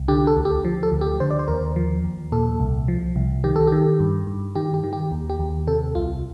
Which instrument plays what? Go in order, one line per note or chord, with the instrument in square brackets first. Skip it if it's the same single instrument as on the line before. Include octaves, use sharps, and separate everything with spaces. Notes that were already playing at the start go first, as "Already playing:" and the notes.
Already playing: [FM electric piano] C2
D3 G4
A4
D2
G4
F3
A4
D2
G4
D3 C5
D5
C5
D#2 A#4
F3
D#2
A#2 A4
C2
F3
C2
D#3 G4
A4
D#3 G4
G2
G2
D#3 G4
G4
D#3
G4
D#2
G4
D#2
C3 A4
C2 F4